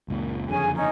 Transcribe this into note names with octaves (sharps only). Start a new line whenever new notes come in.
F#1 C#2 A#2
F#1 F2 D3 C#4 G#4 G#5
C#4 D#4